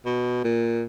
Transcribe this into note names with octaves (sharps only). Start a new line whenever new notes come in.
B2
A#2